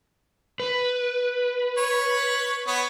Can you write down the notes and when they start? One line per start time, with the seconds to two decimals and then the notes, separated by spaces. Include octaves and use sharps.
0.60 B4
1.78 C#5
2.67 B3 C#5